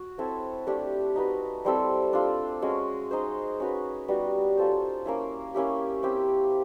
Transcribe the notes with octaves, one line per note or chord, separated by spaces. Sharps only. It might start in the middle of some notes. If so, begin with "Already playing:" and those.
Already playing: F#4
C4 E4 A4 C#5
A3 D4 G4
D#4 F#4 B4
G3 C4 E4 A4
D4 F4 A4
G#3 C#4 F#4
D#4 G#4 C5
C#4 F#4 B4
G3 B3 D#4 F#4
C#4 F4 A4 C5
A#3 C#4 E4
A#3 C#4 E4 G4
C4 E4 G4